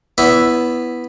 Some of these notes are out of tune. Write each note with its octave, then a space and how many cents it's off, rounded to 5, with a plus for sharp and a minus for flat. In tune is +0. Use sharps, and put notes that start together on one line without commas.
B3 +0 E4 +0 D5 -45